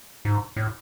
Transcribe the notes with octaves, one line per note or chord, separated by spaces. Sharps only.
G#2
A2